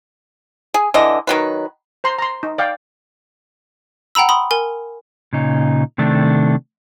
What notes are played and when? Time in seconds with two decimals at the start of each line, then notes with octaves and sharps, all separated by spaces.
0.74 G#4
0.94 D3 E3 D#5
1.27 D#3 F#3 B4
2.04 C5 A#5 C6
2.19 A#5 C6
2.43 D#4
2.58 D5 F5 G5
4.15 F#5 G5 A#5 B5 E6
4.29 B5 C6 D#6
4.51 A#4 G#5
5.33 A#2 C#3 D#4
5.98 C3 D#3 A3 D4